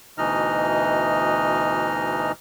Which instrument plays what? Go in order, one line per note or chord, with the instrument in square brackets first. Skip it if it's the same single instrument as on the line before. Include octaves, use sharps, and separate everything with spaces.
[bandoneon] D2 B2 E3 D#4 D#5 F6